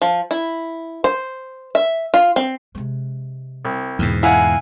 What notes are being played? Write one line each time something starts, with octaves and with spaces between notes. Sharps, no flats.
F3
E4
C5
E5
F4
C4
C3 G#3
C2
E2 G#2 B2 D3
E4 F5 F#5 G#5